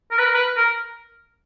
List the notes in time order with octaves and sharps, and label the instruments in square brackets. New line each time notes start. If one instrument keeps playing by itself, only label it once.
[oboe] A#4
B4
A#4
B4
A#4